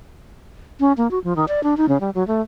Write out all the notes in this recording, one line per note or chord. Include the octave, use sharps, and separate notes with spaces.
C#4
A#3
F#4
F3
D#3
D5
D4
D#4
C#3
G3
F#3
A3